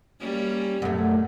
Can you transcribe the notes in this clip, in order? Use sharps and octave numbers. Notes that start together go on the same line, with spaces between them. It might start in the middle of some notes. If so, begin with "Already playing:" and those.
G3 A#3 C#4
F#2 B2 A3